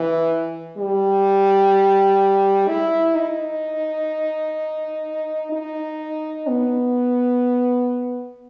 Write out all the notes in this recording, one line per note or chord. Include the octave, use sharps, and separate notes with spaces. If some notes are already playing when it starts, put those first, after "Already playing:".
Already playing: E3
G3
E4
D#4
D#4
B3